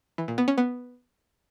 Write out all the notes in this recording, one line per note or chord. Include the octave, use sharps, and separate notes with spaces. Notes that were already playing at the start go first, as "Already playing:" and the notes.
E3
A#2
B3
C#4
B3